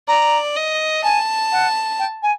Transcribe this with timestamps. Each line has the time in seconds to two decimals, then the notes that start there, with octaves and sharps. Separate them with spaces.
0.08 D5 A#5
0.56 D#5
1.04 G#5 A5
1.52 F#5
1.99 G5
2.23 G#5